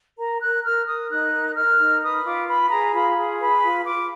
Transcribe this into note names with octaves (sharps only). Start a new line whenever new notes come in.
A#4 A#5
A#4 F#6
A#4 F6
A#4 D#6
D#4 F#6
A#4
A#4 F6
D#4
B4 D#6
F4 D6
B4 B5
G#4 A#5
F4 B5
G#4
B4 B5
F4
F4 D6